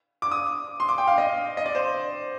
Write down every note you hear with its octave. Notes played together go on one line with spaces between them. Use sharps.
D6
D#6
C6
D6
G5
F5
D#5
D#5
D5
C5